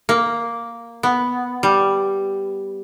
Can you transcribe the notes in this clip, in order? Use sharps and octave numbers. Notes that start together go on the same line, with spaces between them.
A#3
B3
G3